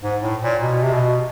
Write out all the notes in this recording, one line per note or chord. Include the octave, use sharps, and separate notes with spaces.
G#2
A2
A#2
B2
C3
B2